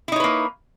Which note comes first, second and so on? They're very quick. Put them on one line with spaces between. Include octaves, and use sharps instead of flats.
E4 D#4 C#5 B4 A#3